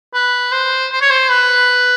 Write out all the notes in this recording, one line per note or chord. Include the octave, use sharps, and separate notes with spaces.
B4
C5
C5
C#5
C5
B4